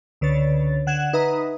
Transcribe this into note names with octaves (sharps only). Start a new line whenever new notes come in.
C#2 D3 B4 C#5 A6
D3 F#5 F#6 G#6 E7
D#4 B4 E5 A#5 D#6